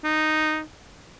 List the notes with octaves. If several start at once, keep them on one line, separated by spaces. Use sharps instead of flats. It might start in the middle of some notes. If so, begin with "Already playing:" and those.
D#4